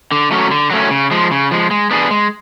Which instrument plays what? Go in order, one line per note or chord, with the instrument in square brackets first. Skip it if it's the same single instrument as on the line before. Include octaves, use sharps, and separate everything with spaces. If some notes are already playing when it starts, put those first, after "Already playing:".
[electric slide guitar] D3
F#3 A3 C#4
D3
F#3 A3 C#4
C#3
F3 G#3
C#3
F3 G#3
G#3
B3 D4 G#4
G#3